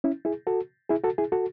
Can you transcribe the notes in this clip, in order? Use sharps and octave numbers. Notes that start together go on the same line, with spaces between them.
C#4 E4
E4 G#4
F#4 A4
E4 G#4
F#4 A4
E4 G#4
F#4 A4